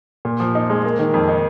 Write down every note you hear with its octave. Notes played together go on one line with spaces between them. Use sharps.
A#2
F3
D#4
G#3
A#3
D#3
F2
D#4